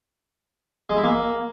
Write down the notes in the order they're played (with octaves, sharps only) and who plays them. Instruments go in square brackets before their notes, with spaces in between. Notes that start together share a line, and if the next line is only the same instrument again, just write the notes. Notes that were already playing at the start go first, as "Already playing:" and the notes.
[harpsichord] G#3
E4
A#3